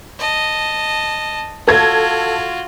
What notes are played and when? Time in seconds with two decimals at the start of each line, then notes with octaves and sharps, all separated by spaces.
0.19 D#5 A5
1.68 F4 F#4 A4 G#6